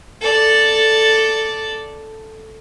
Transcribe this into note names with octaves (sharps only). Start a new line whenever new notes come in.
A4 D5